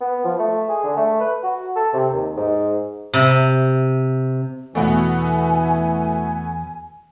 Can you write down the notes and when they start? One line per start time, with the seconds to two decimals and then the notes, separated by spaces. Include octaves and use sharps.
0.01 B3
0.25 F3
0.39 A3
0.69 G#4
0.84 D3
0.97 A3
1.20 B4
1.43 F#4
1.76 A4
1.94 C3
2.12 D#2
2.37 G#2
3.14 C3
4.75 E2 B2 E3 A3 B3 F#4 G#5